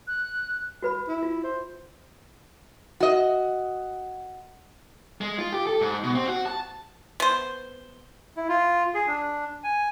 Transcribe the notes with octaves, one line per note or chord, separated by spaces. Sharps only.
F#6
F#4 B4 B5
E4
F4
C5
F#4 D#5
G#3
F4
G4
A4
G#2
B2
C4
F#4
A5
B3 C5
E4
F4
G#4
D4
G#5